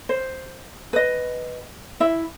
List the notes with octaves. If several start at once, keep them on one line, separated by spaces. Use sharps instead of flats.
C5
B4 D#5
E4 E5